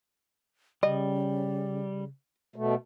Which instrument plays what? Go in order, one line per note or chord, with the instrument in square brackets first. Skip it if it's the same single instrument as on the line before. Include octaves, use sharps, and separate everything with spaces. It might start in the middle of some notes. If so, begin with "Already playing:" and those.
[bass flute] C#3 [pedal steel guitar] G3 [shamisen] D#5
[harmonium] B2 A3